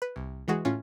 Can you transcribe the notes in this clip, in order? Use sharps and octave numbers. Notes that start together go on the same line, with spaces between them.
B4
C2
E3 G#3 F#4 G#4
A2 C#4 F4